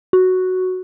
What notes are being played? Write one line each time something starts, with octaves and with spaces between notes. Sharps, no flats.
F#4